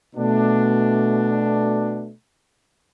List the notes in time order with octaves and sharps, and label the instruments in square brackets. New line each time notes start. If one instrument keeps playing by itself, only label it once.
[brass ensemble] B2 A3 D4